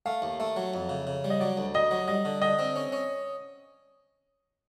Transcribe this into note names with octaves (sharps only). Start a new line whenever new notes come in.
A3 F5
D#2
A3 E5
F#3
F2
C#3
C#3
G3
D#5
F#3 D5
D2
D2 D#5
F#3
G3 D#5
D3
D3 D#5
C4
C#4
C#4